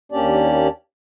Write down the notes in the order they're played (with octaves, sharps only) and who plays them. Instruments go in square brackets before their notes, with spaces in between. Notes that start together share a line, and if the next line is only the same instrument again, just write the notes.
[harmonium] D#2 A#3 C#4 D4 G4 D5